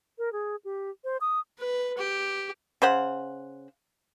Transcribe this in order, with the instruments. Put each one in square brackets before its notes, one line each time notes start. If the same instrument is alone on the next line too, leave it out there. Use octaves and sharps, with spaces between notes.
[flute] A#4
G#4
G4
C5
D#6
[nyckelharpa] B4
G4
[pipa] C#3 C5 F#5